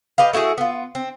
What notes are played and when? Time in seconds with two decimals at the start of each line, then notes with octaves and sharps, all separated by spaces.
0.18 G4 B4 D#5 F5
0.33 A3 E4 F#4 G#4
0.58 B3 F4
0.95 C4